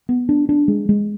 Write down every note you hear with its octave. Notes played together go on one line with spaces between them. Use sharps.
B3
D4
D4
G#3
G#3